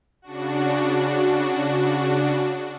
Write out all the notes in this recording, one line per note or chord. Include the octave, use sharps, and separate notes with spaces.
C#3 D4 F#4